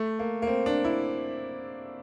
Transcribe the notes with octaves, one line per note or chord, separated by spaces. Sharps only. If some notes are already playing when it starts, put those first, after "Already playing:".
Already playing: A3
A#3
A#3
C4
D4
E4